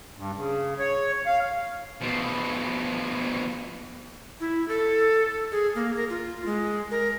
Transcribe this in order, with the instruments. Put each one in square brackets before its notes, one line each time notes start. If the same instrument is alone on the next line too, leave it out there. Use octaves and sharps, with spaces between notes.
[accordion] G2
C#3
C#5
F5
[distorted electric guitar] B2 F3
[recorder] E4
A4
G#4
A#3
A#4
F4
G#3
A#4